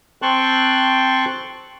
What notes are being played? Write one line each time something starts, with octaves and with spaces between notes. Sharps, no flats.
C4 G5 A5 C6 C#6 F#6